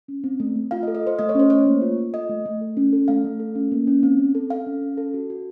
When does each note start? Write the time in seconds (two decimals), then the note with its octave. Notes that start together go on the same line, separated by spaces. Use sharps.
0.08 C#4
0.24 C4
0.40 A3
0.56 A3
0.71 F4 F5
0.83 D#5
0.88 A4
0.95 D#5
1.03 A4 C5
1.19 A3 D#5
1.29 C#5
1.35 C#4 C5
1.50 A3 C#5
1.66 A#3
1.82 F4
1.98 F4
2.14 A4 D#5
2.29 A3
2.46 A3
2.61 A4
2.77 C#4
2.93 A4
3.08 A3 F5
3.25 A3
3.40 A4
3.55 C#4
3.72 A#3
3.87 C#4
4.03 C4
4.19 C4
4.35 A4
4.50 A4 F5
4.66 C#4
4.82 C#4
4.97 A4
5.14 F#4
5.30 F#4